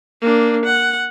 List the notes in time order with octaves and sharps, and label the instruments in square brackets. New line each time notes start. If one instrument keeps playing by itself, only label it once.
[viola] A#3 D4
F#5